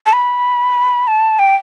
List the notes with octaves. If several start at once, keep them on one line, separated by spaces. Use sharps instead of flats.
A5
B5
A5
G5